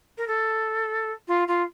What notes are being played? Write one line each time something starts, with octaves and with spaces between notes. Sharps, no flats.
A#4
A4
F4
F4